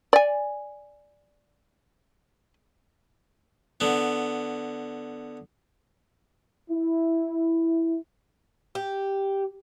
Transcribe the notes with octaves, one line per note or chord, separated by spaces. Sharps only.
D5 G#5
D3 B3
E4
G4